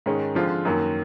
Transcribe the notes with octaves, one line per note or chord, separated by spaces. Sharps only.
G#2 D#3 G#3 C#4
D3 F3 G#3 C4 F4
F#2 D#3 F#3 A#3